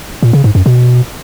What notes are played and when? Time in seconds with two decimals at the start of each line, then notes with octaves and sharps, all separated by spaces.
0.23 A#2
0.33 C#3
0.44 G#2
0.55 F#2
0.66 B2